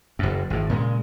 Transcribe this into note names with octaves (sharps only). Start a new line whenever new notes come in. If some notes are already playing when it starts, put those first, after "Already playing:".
F#1 F#2
G#1 A2
A#2 C#3 F#3 G#3